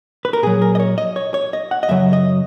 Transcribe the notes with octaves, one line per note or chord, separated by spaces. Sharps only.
B4
A#4
A#2 F#3 G#4
A#4
D#5
C#5
D#5
C#5
C#5
D#5
F#5
D#5
F#2 C#3 F#3 E5
D#5